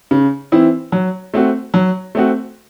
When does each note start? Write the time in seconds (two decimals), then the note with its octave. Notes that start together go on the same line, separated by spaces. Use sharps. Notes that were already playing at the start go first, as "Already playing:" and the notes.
0.11 C#3
0.52 E3 C4 E4
0.92 F#3
1.34 A3 C4 F#4
1.74 F#3
2.15 A3 C4 F#4